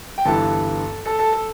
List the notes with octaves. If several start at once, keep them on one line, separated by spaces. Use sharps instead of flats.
G5
G1 G2 E3 A4 A5
A4 A5
A4 A5
A4